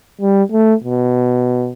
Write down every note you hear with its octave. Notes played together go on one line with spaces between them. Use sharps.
G3
A3
B2